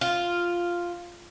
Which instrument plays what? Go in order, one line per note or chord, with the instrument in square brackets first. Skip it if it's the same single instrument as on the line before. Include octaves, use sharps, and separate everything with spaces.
[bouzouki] F4